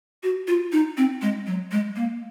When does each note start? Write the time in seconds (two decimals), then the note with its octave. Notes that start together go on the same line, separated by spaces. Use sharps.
0.23 F#4
0.48 F4
0.72 D#4
0.97 C4
1.22 G#3
1.47 F#3
1.72 G#3
1.96 A#3